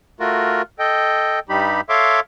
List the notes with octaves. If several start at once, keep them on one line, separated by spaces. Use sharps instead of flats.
A3 F4 F#4 A#4
A4 D#5 G5
G2 G3 D#4 G4 B5
A4 C#5 E5 F5 C6 D6